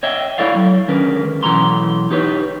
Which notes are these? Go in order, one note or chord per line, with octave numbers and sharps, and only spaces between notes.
C#5 D#5 E5 G5
G#3 E4 A4 C#5 D5 F5
F#3
D3 D#3 G#3 C#4 A#4 B4
B1 E3 F3 A4 A#5 C6
D#4 G4 B4 C#5